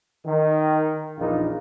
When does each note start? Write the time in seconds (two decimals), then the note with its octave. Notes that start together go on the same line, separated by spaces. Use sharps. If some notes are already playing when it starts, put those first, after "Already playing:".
0.25 D#3
1.19 A#1 E2 A#3 D#4 F4